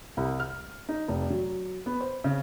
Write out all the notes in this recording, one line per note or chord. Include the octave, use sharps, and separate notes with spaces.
C2
F6
D#4
F1
F#3
B3
C5
C#3